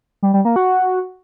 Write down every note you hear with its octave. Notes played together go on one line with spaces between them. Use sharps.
G3
G3
A#3
F#4